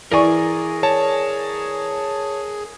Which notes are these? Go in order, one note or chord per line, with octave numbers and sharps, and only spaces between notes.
E3 G#4 A#4 D5 G#5 C#6
C#5 A5